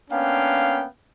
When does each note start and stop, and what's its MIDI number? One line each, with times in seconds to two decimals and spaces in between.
0.11 0.85 58
0.11 0.85 59
0.11 0.85 61
0.11 0.85 62
0.11 0.85 77
0.11 0.85 79